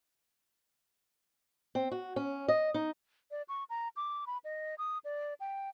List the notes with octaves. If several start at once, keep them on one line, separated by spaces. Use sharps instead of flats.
C4
F#4
C#4
D#5
D#4
D5
C#6
A#5
D6
B5
D#5
D#6
D5
G5